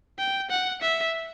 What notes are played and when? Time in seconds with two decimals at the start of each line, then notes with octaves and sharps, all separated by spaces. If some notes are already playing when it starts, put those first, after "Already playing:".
0.19 G5
0.50 F#5
0.82 E5